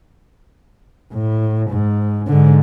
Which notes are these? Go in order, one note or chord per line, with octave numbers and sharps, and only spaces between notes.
A2
G#2
G#2 D3